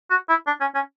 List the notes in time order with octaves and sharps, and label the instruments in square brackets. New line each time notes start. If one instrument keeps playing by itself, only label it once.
[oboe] F#4
E4
D4
C#4
C#4